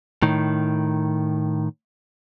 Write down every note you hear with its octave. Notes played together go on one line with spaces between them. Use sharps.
A2 D#3